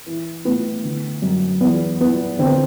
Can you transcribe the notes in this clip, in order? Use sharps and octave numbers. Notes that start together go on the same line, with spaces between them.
E3
A2 B3
D3
F#2
E2 B3
E3 B3
D3 C4
B3